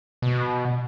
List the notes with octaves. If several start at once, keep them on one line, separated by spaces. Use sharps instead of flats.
B2